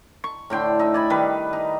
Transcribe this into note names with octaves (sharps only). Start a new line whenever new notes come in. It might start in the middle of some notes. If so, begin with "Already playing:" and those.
C#6
A2 D3 G5 C6
D#4 E5
D5 G#5 B5
D#3 G3 B4
D#4